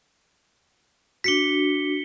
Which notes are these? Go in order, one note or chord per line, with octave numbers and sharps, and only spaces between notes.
D4 F#4 B6 C#7 G7